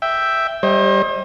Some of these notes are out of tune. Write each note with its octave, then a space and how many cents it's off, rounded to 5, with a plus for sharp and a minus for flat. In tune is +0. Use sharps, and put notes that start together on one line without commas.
E5 +0 G5 +0
G3 +0 C5 +40 D#5 +20